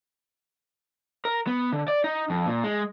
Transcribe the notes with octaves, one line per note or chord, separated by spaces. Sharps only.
A#4
B3
D3
D5
D#4
F2
A#2
G#3